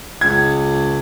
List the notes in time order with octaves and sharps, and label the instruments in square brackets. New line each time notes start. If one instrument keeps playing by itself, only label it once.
[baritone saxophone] C#2 [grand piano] G#6